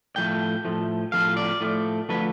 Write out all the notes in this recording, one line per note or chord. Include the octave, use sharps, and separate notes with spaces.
A2 F3 A3 G5
A2 F3 A3
A2 F3 A3 F5
D5
A2 F3 A3
D3 F3 A3 B4